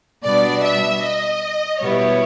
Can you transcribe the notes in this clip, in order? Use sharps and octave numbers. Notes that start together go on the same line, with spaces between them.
B2 G3 B3 D4 F#4 D5
E5
D#5
B2 G3 B3 E4 C#5